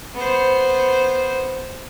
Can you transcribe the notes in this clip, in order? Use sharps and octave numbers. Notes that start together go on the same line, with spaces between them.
B3 C5